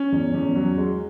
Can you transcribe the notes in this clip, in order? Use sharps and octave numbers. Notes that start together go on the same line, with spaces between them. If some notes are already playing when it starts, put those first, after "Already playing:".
Already playing: C#4
E2
E2
F#3
G#3